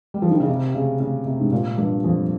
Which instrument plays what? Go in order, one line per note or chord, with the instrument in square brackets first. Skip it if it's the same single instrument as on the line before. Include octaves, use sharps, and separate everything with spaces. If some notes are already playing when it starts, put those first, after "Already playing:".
[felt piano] G3
F3
D#3
C#3
C3
C#3
C#3
C3
G#2
A#2
G2
F2